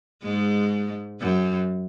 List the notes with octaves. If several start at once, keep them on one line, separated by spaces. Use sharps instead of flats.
G#2 G#3
F#2 F#3